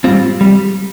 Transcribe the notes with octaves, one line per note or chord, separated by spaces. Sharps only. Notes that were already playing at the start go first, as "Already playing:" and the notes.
G#2 G3 C4 F4
G3